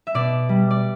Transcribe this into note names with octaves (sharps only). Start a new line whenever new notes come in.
E5
B2 D5
G3
D5